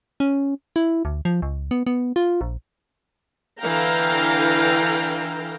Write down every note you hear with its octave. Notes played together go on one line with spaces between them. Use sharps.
C#4
E4
D2
F3
C#2
B3
B3
F4
A#1
D3 E3 F5 G5 A#5